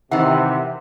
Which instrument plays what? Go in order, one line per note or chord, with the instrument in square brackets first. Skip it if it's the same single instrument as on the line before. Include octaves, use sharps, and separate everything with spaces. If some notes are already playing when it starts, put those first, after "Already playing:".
[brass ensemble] C3 [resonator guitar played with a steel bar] D#3 E3 [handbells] E5 F#5